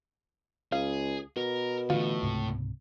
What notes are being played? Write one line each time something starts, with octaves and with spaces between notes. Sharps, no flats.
C#2 G#4 F5
B2 A#4
A2 D3 E3 F4
C#2 G#2 C3